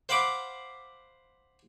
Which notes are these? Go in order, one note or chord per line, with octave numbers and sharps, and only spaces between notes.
C5 F5 F#5 B5 D6